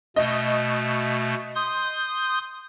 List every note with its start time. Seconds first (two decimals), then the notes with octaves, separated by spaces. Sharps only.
0.16 B2 A3 D#5
1.55 C6 D#6 G6